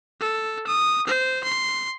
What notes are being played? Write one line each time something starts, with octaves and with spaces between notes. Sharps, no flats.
A4
D#6
C5
C6